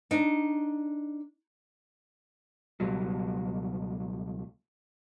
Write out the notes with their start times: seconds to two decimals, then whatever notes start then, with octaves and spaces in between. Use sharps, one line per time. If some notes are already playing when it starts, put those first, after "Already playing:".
0.11 D4 D#4
2.80 C#2 B2 F#3 G3